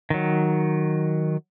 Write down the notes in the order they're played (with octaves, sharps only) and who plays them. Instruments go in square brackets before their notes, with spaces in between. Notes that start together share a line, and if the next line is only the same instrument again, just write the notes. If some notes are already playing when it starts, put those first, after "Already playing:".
[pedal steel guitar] D#3 F#3